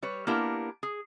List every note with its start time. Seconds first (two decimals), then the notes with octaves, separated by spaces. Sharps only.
0.03 G3 B4 C#5
0.27 A#3 B3 D4 E4 G4 A#4
0.83 G#4